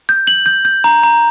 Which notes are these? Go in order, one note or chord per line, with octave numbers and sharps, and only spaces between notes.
G6
G6 F#7
G6
G6
A#5
A#5